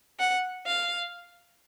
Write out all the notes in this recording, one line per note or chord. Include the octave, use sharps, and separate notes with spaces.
F#5
F5